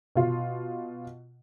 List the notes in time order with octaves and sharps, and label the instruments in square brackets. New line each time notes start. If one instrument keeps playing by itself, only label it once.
[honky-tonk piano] B2 F4